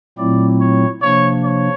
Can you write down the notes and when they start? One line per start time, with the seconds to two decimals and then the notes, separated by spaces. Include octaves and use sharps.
0.18 A#2 F#3 A3 C4 E4 D5
0.60 C#5
1.01 C3 F3 A#3 D4 C#5
1.44 C#5